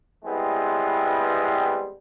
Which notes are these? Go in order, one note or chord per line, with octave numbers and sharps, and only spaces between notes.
E3 G3 G#3 B3 C4